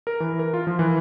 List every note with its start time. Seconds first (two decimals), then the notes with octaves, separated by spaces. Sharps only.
0.07 A#4
0.20 E3
0.39 A#4
0.54 F4
0.67 F3
0.79 E3